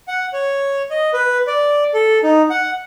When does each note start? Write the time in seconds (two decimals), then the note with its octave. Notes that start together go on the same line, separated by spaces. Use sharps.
0.08 F#5
0.33 C#5
0.90 D#5
1.13 B4
1.47 D5
1.94 A4
2.23 D#4
2.50 F#5